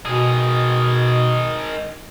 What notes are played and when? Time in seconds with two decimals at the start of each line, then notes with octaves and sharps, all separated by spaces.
0.06 B2 D#3 G#4